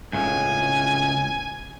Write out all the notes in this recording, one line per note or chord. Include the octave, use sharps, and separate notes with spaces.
C#2 A2 C#3 G#5